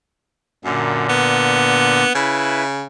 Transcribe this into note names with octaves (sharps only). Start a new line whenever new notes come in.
F#2 A#2 D3
B3
C#3 E4 B4